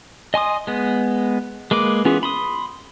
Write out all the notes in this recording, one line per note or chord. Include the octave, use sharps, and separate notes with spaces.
D#5 G#5 C6 D#6
G#3 B3
G#3 A#3 B4 D6
E3 B3 C#4 F4 G#4
B5 C6 D#6